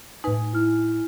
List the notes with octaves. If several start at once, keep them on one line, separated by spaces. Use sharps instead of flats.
A2 D#4 B4 G#5
E4 F6